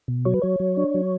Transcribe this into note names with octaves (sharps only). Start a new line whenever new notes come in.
B2
F#3 C#5
B4
F#3 C#5
F#3
D4
F#3